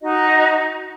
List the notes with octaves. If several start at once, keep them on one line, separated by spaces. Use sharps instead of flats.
D#4 F#4 D#5